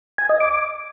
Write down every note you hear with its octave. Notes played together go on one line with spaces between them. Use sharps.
G#5
D#5
D6